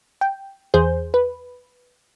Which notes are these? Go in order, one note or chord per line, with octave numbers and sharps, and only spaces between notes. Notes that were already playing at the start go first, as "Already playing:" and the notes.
G5
E2 G#4 C5 G6
B4